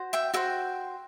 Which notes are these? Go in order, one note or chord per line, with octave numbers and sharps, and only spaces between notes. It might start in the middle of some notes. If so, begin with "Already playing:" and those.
Already playing: F#4 C5
E5 G5
F#4 C5 E5 G5